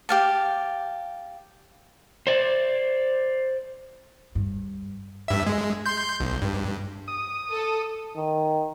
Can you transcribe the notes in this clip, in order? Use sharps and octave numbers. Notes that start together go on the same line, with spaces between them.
G4 F5 A5
C5 D5
G2
G2 E5
G#3
C6 G6
B1
G2
D#6
A4
D#3